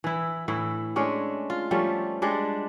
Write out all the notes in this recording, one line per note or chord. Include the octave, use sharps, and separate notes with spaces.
E3 E4
A2 E3 E4
G#3 A3 C#4 D4
F4
F3 G3 A3 C#4
G3 G#3 D4